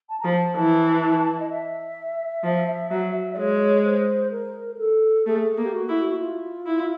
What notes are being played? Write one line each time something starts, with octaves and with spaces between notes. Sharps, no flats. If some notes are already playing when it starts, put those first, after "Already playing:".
A5
F3 A#5
A5
E3 A5
D#5
E5
F3
F#3
D5
G#3 C#5
C5
A#4
A#4
A4
A3 G#4
A#3
G4
F#4
E4
F#4
F4
E4